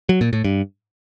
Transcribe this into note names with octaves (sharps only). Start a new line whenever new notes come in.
F#3
A#2
A2
G2